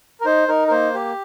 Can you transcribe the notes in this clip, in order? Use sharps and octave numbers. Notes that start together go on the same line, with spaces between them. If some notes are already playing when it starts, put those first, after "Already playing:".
A#4
D#4 C5
D#4 A#4
A#4
A#3 C5
G4